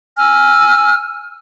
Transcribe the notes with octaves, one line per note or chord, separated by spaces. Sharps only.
G#5 E6 F6